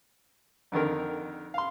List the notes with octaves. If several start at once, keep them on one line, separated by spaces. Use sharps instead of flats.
F2 D3 D#3 A#4
F5 C6